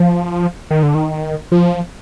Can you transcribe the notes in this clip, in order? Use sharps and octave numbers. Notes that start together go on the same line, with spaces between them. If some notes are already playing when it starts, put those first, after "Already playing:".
Already playing: F3
D#3
D3
D#3
F3